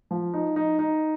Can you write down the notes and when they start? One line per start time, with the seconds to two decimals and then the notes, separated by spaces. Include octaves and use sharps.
0.11 F3
0.34 D#4
0.56 D#4
0.79 D#4